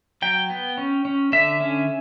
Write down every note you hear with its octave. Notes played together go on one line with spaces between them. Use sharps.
F#3 G5
B3
C#4
C#4
D3 E5
C#4